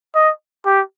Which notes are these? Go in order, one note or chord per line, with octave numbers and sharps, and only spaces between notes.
D#5
G4